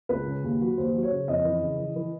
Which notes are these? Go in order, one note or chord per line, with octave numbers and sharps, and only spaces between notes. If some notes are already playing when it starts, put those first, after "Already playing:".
C#2 B4
C#3
D#2
F#3
D#2 C5
F#3
C#5
C#3
F2 D#5
E3
C#3
E3
E3